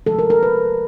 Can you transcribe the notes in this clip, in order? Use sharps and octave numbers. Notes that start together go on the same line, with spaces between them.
C3 F3 G#3 A4
A#4
A#4
B4